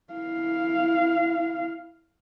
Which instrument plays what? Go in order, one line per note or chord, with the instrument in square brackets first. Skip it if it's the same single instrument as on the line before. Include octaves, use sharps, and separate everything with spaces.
[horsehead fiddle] E4 F5